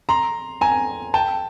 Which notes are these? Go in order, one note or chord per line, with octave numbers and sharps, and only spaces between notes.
A#5 C6
G#5 A#5
G5 A5